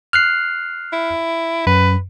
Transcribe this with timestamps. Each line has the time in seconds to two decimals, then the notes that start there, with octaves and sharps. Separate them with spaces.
0.13 F6 F#6 C7
0.93 E4
1.67 F#2 B4